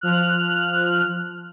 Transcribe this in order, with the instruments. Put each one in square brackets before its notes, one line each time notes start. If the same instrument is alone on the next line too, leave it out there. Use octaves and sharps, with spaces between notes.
[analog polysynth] F3 F6 F#6